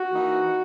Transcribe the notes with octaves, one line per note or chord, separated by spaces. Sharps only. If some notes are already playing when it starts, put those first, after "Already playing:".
Already playing: F#4
E3 A#3 D#4